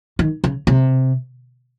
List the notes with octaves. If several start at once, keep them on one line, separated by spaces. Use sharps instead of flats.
D#3
C#3
C3